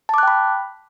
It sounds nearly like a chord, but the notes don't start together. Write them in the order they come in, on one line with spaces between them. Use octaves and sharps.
A5 D6 F#6 G5 B5